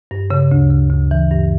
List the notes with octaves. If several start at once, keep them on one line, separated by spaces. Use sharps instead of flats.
G2
C#3
D2
C#3
D2
E3
G2